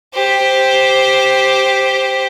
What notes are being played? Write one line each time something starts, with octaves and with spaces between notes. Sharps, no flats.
G4 C5